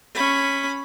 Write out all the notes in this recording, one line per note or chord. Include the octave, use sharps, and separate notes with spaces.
C#4 B5